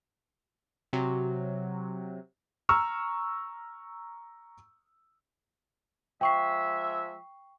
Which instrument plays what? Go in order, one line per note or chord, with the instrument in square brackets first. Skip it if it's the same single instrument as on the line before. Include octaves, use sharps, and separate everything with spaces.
[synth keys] C3 F#3
[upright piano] A#5 C#6 E6 F6
[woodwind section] F3 G#3 E5 [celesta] G5 C#6 C7